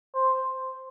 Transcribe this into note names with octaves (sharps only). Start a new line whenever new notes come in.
C5